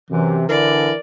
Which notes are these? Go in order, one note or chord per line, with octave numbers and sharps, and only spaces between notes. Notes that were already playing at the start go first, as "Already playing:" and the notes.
F#2 C3 E3
D3 E3 A#4 D5